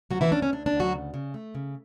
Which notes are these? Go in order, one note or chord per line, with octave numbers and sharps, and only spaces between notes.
D2 F#3 F#4
E3 E4
C#4 D4
C#4
D2 D4
D4
D2
F#3 F#4
C#3
C#3
A3
C#3